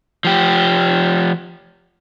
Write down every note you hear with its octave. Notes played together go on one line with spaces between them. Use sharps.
F3 G4